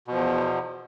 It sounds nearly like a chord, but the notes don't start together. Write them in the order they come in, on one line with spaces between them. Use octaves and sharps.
B2 F3 E2